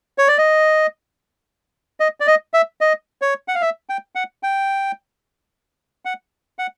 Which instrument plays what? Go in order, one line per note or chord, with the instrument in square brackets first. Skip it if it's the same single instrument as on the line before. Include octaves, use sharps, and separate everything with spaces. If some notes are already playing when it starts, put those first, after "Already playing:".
[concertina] C#5
D5
D#5
D#5
D5
D#5
E5
D#5
C#5
F#5
F5
E5
G5
F#5
G5
F#5
F#5